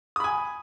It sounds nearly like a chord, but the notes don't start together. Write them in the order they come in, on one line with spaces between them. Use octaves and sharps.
D#6 B5 G#5